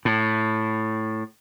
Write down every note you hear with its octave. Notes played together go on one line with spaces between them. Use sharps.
A2